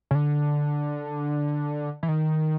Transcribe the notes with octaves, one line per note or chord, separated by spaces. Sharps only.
C#3
D3
E3
D#3